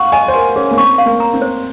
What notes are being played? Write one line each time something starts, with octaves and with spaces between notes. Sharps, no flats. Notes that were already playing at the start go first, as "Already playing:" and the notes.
Already playing: F5 F#5 C#6
D#5 G#5
C5
A#4 G#5
C#4 G#4
A#3
C4 C#6
F5
A#3
A#5
C4
C5